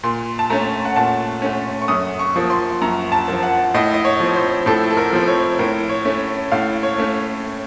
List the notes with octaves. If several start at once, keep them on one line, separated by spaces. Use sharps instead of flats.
A#2 C6
A5
A3 C#4 A#5
F#5
A#2 A5
A3 C#4
C#6
F#2 D#6
C#6
F3 A#3
C6
F#2 A#5
A5
F3 A#3
F#5
A2 D#5
D#5
C#5
F3 C4
C5
A2 A4
A4
A#4
F3 C4
C#5
A2 A#4
C#5
A3 C#4
A2 F5
C#5
A3 C#4